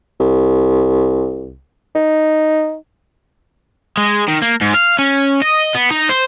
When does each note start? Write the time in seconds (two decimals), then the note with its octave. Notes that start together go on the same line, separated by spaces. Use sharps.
0.20 C2
1.95 D#4
3.97 G#3
4.28 D#3
4.42 A#3
4.61 G#2
4.74 F5
4.99 C#4
5.42 D#5
5.74 B3
5.90 D#4
6.09 C5